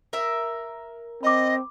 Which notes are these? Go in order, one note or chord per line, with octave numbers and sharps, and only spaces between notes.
A#4 E5
C4 D#5 B5 D6